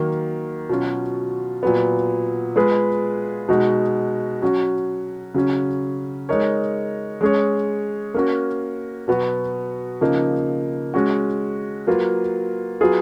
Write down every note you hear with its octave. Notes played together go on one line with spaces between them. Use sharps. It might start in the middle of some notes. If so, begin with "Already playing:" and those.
Already playing: D#3 F#3 A#3
B2 F#3 C#4 F4
A#2 F#3 B3
G#3 B3 F4 G#4 B4
B2 G#3 D#4 F#4
F#3 C#4 F#4
C#3 F#3 C#4
G#3 D#4 A#4 C#5
G#3 C#4 G#4 C#5
A#3 C#4 F#4 A#4
B2 F#3 B3 F#4
C#3 F3 A#3 D#4
G#3 C#4 F#4
F#3 A#3 F4 B4
F#3 B3 F4 G#4